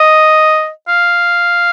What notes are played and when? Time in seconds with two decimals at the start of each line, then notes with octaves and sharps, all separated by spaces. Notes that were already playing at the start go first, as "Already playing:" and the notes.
Already playing: D#5
0.88 F5